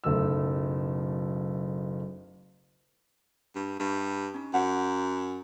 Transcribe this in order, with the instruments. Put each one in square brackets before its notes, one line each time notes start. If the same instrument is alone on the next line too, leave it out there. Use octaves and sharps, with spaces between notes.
[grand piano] F#1 B1 A3 E6
[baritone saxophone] G2
[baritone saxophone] G2 [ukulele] G4 E5
[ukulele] C#4 D#4
[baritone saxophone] F#2 [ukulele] C5 E5 F#5